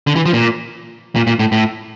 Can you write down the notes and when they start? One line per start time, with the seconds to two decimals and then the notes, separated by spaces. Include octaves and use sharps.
0.07 D3
0.16 E3
0.26 F3
0.33 A#2
1.16 A#2
1.27 A#2
1.40 A2
1.52 A2